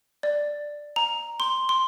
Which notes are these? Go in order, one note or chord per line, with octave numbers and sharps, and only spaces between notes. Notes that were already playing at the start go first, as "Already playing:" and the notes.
D5
A#5
C6
C6